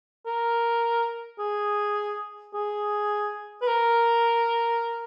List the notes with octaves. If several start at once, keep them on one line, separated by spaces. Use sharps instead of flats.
A#4
G#4
G#4
B4
A#4